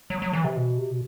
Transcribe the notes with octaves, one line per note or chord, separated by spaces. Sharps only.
F#3
F#3
E3
C3
B2
C3
B2